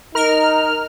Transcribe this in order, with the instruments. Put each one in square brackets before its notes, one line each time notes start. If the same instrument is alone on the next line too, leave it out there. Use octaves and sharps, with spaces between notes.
[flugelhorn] D#4 [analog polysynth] A#4 F6